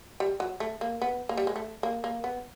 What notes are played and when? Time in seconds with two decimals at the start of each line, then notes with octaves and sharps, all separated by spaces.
0.20 G3
0.40 F#3
0.60 A3
0.81 A#3
1.01 B3
1.29 A#3
1.37 G3
1.47 G#3
1.56 A3
1.83 A#3
2.04 A#3
2.24 B3